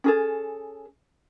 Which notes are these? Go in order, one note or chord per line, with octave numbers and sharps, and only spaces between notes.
C#4 G#4 A4